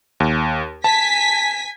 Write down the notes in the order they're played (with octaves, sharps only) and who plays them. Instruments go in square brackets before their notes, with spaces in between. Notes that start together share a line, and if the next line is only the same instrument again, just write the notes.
[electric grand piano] D#2
[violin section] G#5 B6 [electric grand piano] A5